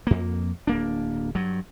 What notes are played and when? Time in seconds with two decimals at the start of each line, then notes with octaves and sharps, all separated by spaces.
0.07 F2 A#3
0.67 D1 A#3 D4
1.35 G2 F#3